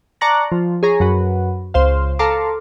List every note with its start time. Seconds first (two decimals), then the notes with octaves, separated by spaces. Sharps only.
0.21 D5 A5 A#5 C#6 F#6 A#6
0.52 F3
0.83 G#4 C#5 A#5
1.00 F#2 F#4 B4
1.74 C#2 C5 F5
2.19 A4 F5 A#5 C6 D6